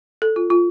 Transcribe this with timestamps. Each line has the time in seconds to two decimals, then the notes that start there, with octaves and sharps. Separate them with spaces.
0.22 A4
0.36 F4
0.50 F4